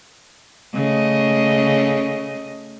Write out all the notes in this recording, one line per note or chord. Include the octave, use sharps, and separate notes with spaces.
C#3 A3 D#5